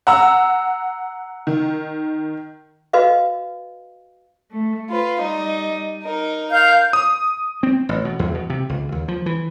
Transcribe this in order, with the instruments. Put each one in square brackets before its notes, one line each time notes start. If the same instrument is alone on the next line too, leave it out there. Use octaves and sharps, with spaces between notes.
[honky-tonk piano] F#5 A#5 E6
D#3
[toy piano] F#4 B4 D#5 F5
[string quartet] A3
F4 B4
G3 D#4 D#5
D#4 A#4
[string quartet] A#4 [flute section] F5 G6
[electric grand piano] D#6
[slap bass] C4
A1
B2
E2
B2
C3
C#2
D#2
F3
E3